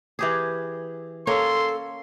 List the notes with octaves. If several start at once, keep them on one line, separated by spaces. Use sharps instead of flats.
E3 G4 G#4
A#3 C#4 A4 C#5 C6